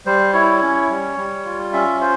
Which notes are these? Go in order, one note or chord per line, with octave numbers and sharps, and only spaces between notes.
G3 C5
E4 C#5
C#4
G3
G3
F4
C#4 E5
F4 C5